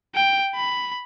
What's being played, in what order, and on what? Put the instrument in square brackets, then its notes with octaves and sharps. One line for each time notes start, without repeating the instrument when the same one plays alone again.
[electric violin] G5
B5